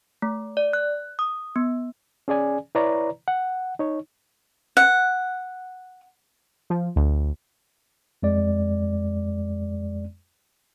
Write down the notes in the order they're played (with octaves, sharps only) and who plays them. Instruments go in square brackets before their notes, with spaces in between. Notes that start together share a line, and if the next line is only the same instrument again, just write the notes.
[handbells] A3
D5
F#6
D#6
B3
[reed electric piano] C#4 G#4 D5 G#5
E4 B4 C#5 D5 A#5
F#5
D#4 C#5
[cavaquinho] F#5
[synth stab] F3
D2
[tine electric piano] F2 G#3 D5